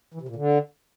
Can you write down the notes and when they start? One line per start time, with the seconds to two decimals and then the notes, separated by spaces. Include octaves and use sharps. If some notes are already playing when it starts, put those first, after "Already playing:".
0.14 E3
0.21 C3
0.29 A#2
0.36 D3